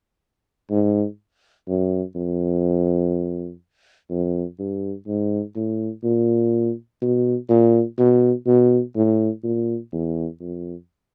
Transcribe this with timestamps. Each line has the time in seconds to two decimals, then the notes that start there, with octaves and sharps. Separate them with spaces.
0.71 G#2
1.68 F#2
2.16 F2
4.10 F2
4.59 G2
5.07 G#2
5.56 A2
6.04 A#2
7.02 B2
7.49 A#2
7.98 B2
8.47 B2
8.96 A2
9.44 A#2
9.93 E2
10.40 F2